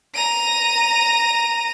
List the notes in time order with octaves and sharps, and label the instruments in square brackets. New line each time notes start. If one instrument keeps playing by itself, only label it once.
[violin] A#5 D#7